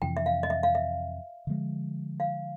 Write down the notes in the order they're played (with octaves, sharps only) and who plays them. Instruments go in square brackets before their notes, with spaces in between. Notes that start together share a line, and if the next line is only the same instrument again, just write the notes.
[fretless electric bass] F2 C3 E3 [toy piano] G5
[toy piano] E5
F5
D#5
E5
F5
E5
[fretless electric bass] D3 F3 G#3
[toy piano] F5